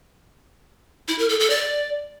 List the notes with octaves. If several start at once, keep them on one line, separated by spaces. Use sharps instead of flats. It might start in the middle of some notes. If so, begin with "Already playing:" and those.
E4
A#4
A4
A4
D5